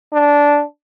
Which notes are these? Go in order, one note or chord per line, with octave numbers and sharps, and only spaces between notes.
D4